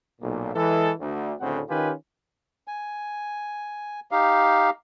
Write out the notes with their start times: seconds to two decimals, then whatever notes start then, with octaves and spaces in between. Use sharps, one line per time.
0.21 B1 A#2
0.55 E3 G#3 A4
1.00 D2
1.40 D2 A2 C#3 C4 F#5
1.69 D#3 C#4 F4 G4 B4 G#5
2.68 G#5
4.11 D#4 G4 F5